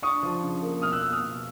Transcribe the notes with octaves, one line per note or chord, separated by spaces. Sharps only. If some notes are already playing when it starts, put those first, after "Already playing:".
D4 C#6 D#6
F3
C#3
A#3
B2 D#6 F6
E6 F#6
A#3 E6 F#6
D#6 F6
B2